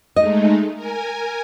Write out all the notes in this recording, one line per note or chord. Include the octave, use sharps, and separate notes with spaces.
G#3 A3 D#4 D#5
A#4 G#5